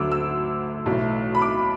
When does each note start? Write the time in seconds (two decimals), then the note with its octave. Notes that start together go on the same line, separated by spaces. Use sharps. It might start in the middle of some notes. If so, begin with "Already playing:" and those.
Already playing: D2 D3 F#3 D6 E6
0.11 E6
0.86 B1 A2 E3 A3
1.35 B5
1.42 D6